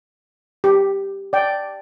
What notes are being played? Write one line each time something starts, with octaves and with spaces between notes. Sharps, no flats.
G4
D5 G5